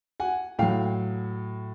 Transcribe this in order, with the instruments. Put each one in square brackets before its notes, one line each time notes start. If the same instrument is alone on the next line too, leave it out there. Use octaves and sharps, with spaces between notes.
[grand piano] F#5 G#5
A2 F#3 F5 G5